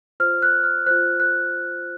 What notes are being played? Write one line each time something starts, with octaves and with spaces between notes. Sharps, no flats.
F4 C5 F6
F#6
F6
F4 C5 F#6
F#6